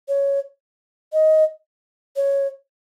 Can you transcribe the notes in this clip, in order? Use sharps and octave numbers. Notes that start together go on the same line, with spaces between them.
C#5
D#5
C#5